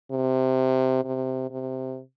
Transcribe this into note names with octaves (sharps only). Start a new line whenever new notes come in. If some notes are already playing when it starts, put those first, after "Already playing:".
C3
C3
C3